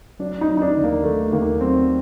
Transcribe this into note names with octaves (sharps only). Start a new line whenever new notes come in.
F#3 D4
D#4
F#3
D#4
D4
D#2
A#3
D#3 A3
D#2 A#3
F#3 C4